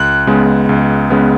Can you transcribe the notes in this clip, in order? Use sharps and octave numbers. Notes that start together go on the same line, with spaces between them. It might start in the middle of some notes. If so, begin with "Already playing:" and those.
Already playing: C#2 F#6
C#3 G#3 B3
C#2
C#3 G#3 B3